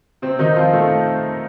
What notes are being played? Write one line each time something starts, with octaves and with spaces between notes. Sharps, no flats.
C3 C4
D#3 D#4
F3 F4
A3 A4